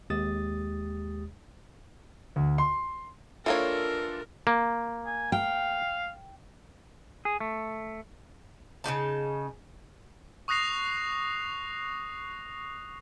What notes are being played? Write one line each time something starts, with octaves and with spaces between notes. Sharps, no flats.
D#2 G#3 G4 D#6 A6
D2
C6
E3 A#3 D4 F4 A4 A#4 C#5
A#3
G#5
F5 G5
G#4
A3
C#3 C#4 D#4 A5
C#6 D#6 F#6 A#6 C7 F7